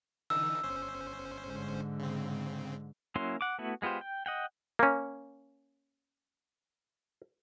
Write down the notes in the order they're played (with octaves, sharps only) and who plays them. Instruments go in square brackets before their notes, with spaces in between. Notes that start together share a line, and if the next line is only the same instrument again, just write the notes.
[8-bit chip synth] D3 E3 D#4 [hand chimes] E6
[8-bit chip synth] G1 C#4 C5
[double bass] G#2 D3
[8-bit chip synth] C#3 C4
[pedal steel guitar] F#3 A#3 C#4 E4 C6
F#5 D6
A3 B3 E4 F#4
G#3 B3 F4 G4 C5
G5
D#5 F#5 G5
[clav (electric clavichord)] A#3 C#4